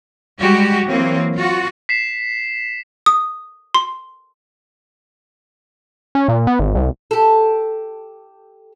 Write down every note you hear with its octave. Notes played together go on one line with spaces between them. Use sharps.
G3 G#3 F#4 G4
E3 F#3 A#3 C4
F4 F#4
B6 C7 E7
D#6
C6
C#4
A#2
B3
G#1
C2
G4 A4